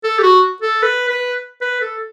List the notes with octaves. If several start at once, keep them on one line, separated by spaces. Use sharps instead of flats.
A4
G4
F#4
A4
B4
B4
B4
A4